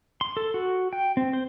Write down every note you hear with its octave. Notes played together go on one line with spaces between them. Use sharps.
C6
A4
F#4
G5
C4
C5